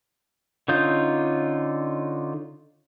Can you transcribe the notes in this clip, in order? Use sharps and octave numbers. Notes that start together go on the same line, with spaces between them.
D3 C#4 D#4 F4 G6